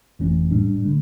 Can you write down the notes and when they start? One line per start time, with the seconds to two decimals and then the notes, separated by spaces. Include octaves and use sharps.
0.19 G1 F2 E3 A3 C#4
0.51 A#1 A2 G3 D4
0.84 D3 A3